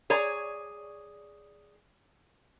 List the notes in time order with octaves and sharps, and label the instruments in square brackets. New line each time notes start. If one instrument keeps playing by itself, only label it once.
[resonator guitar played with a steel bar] G#4 C#5 D5 A#5